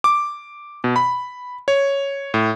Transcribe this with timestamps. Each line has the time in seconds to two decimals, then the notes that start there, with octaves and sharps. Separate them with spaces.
0.04 D6
0.84 B2
0.96 B5
1.68 C#5
2.34 A2